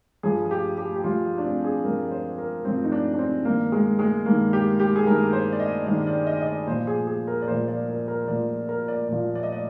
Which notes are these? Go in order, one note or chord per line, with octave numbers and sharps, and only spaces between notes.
G2 F3 G#4
G4
G4
G4
G2 F3 F4
D4
C4
G#4
G2 F3 A#4
C5
A#4
G2 F3 C4
D#4
D4
D4
C4
G2 D#3 A#3
G#3
G#3
G2 D#3 A#3
G4
G4
G#4
G2 D#3 A#4
C5
D5
D#5
G2 D#3 D5
D5
D#5
D#5
D5
A#2 F3 C5
G#4
G#4
A#4
D5
A#2 F3 C5
D5
A#4
A#4
A#2 F3 D5
A#4
D5
A#2 F3 D5
D5
D#5
D5